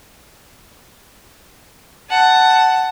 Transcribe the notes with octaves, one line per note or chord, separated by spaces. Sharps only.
F#5 A5